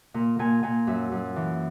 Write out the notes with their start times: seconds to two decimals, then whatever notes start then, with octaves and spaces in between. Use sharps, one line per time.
0.14 A#2
0.39 A#2 G#5
0.63 A#2 G#5
0.87 F#2 E5
1.12 F#2
1.36 E3